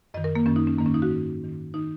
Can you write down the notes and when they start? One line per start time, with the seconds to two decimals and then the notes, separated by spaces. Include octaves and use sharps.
0.14 F#2 D#3 D#5
0.24 A#4
0.35 A#3
0.46 F#2 D#3 C#4
0.56 D#4
0.67 C#4
0.78 G#2 D#3 A#3
0.86 C#4
0.94 D#4
1.02 F#4
1.10 G#2 D#3
1.42 G#2 D#3
1.74 D#3 D#4